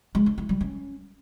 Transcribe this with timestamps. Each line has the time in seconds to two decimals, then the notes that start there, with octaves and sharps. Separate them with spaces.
0.15 G#3
0.26 D4
0.38 E4
0.49 G3
0.61 C#4